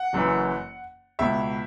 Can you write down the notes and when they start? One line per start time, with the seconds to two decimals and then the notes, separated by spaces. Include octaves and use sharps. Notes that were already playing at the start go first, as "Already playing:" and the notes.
Already playing: F#5
0.13 F#1 F#2 E3
1.19 C#2 B2 E5